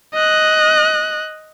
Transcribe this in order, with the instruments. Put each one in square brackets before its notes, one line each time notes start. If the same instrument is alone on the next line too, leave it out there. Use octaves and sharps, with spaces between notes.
[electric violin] D#5 F#6